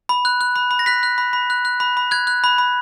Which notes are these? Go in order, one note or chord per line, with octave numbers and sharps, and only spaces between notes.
B5
F#6
F#6
B5
B5
A#6
F#6 B6
F#6
B5
B5
F#6
F#6
B5
B5
F#6 G#6
F#6
B5
B5